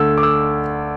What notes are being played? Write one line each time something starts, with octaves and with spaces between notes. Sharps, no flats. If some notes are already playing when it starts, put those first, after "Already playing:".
Already playing: D2 D3 A3 E6
D6
E6